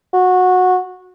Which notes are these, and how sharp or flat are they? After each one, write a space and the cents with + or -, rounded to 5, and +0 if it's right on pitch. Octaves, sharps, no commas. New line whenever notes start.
F#4 -15